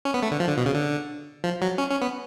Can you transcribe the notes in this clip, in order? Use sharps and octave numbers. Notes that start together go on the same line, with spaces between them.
C#4
B3
A3
D3
F3
D3
B2
C#3
D3
F3
F#3
C#4
C#4
B3